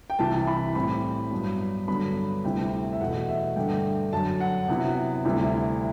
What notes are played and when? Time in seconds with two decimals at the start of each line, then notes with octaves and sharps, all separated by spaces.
0.10 G5
0.19 C2 C3 E3 A5
0.47 B5
0.75 A2 G3 C4 B5
1.32 G2 F#3 B3 D4
1.88 G2 D3 F#3 B3 D4 B5
2.44 D2 C3 G3 C4 E4 G5
2.92 E5
3.00 E2 B2 A3 F#5
3.28 E5
3.56 G2 D3 A3 D4 G5
4.13 F#2 D3 F#3 A5
4.40 F#5
4.68 C3 F#3 B3 E4
5.25 D2 C3 G3 C4 E4